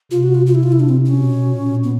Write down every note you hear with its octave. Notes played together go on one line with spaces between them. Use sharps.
C3 F4
F#4
F4
F4
E4
F4
E4
D4
C4
C#4
B2
A#2
B3